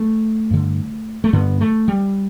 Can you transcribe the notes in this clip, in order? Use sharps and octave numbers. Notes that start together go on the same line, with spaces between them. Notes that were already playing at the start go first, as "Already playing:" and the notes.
Already playing: A3
G2 D3
A3
G2 D3 B3
A3
G3